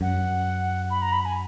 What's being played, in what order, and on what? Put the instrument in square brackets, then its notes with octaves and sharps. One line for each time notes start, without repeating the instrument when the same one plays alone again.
[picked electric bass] F#2 [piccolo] F#5
[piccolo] B5
A#5
B5
G#5